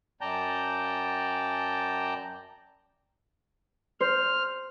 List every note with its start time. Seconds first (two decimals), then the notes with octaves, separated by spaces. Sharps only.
0.21 F#2 D5 G5 A5 A#5 G6
4.00 C5 F6